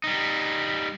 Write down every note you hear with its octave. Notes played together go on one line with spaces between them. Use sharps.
G3 D#4